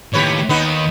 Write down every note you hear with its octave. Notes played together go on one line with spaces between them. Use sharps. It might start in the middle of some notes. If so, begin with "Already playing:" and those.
D#2 A2 G4 B4 C#5
D#2 D#3 B3 D#4 B4